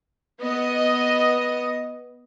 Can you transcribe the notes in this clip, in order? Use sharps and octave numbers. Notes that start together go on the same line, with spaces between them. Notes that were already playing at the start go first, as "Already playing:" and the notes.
B3 D#5